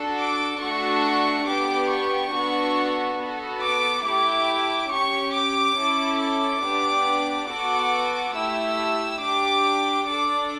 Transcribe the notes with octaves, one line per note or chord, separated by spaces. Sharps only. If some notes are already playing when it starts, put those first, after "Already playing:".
Already playing: D4 F#4 A4
D6
A3 D4 F#4 A4 C#6
B3 D4 G4 D6
C#6
B3 D4 F#4 A4
B3 F#4 A4
D6
A3 E4 G4 D6
C#4 G4 C#6
D6
C#4 E4 A4
D6
B3 D4 G4
B3 F#4 A4 D6
A3 E4 G4 E6
D4 G4 D6
D4 A4 D6